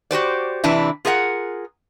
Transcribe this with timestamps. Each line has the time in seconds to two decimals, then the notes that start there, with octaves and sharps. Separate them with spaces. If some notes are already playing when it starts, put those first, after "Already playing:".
0.11 F#4 G4 C5 D5
0.64 C3 E3 D4 E4
1.05 F4 G#4 A#4 E5 F#5